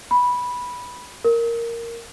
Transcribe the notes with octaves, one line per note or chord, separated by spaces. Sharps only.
B5
A#4